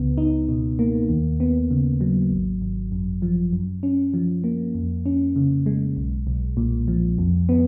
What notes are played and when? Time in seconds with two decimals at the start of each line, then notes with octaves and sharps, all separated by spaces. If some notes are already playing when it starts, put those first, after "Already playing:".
Already playing: C#2 B3
0.18 D#4
0.49 B2
0.79 A#3
1.09 D#2
1.40 B3
1.71 C#3
2.01 F#3
2.31 G#1
2.62 G#1
2.92 F#2
3.22 F3
3.53 F#2
3.83 C#4
4.14 F3
4.44 A#3
4.75 F2
5.06 C#4
5.36 C#3
5.66 G#3
5.97 B1
6.27 B1
6.57 A#2
6.88 F3
7.19 F2
7.49 B3